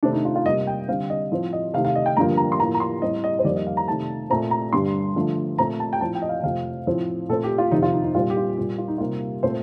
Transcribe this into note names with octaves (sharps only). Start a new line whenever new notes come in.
C3 D#3 A3 C4 D4
D#4
F4
F4
C3 G3 A#3 D#5
G5
D3 G3 C4 F5
D#5
A2 F3 C4
D#5
C3 D#3 A3 F5
F5
D#5
G5
G2 D3 F3 A#3 A#5
A#5
C6
A2 F3 A#3 A#5
A#5
C6
A2 G3 C4 D#5
D#5
C5
F2 D#3 G3 A#3 D5
D#5
F5
A#5
C3 D#3 A3 A5
A#2 A3 C4 A#5
A#5
G2 D3 G3 C6
D3 F3 A3
A#2 A3 C4 A#5
A5
G5
A2 F3 C4 A5
G5
D#5
F5
F2 C3 F3 A3 F5
A2 F3 C4
A#2 A3 C4 A4
G4
F4
F2 C3 D#3 D#4
F4
D#4
D#4
A#2 G3 C4 F4
G4
F4
A#2 G3 C4 G4
F4
D#4
C3 G3 A#3 F4
A#2 A3 C4 C5